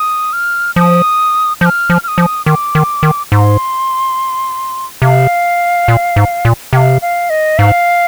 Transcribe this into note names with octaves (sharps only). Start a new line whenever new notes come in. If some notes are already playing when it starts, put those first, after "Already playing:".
Already playing: D#6
F6
F3 D#6
F3 G6
F6
F3
F6
D#6
F3
D#3 D6
D#3
D#3
G#2 C6
C3 F5
A#2
G#2
A#2
C3 F5 G5
F5
D#5
G#2 F5